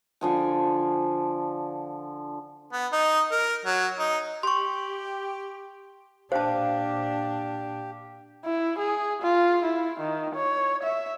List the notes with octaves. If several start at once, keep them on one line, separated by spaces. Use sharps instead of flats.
D3 F3 G#5
B3
D#4
A#4
F#3
D#4
G4 C6 C#6
A#2 D4 G4 C5 F5 A5
E4
G#4
F4
E4
D#3
C#5
E5